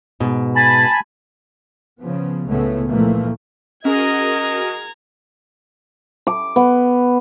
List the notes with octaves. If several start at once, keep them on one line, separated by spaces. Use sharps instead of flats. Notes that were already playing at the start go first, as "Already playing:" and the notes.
G#2 B2
G#5 A5 B5 A6
C#3 F3 B3
C#2 A2 C#3 A3 B3
A#2 E3 F3 A3 A#3
C#4 F#4 G#4 A#4 D#5 A#5 G#6
D6
B3